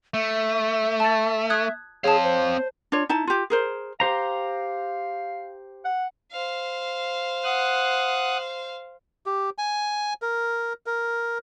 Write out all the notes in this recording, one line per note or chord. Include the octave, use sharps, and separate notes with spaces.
A3 E5
A5 A6
D#6 F#6 G#6
C4 G#4 C#5 F5 A5
C5
D4 F4 C#5
D#4 E4 A5
F4 G4
G#4 A#4 C5
G4 C5 F5 A#5
F#5
C5 F5
F#5 D#6 F#6
G4
G#5
A#4
A#4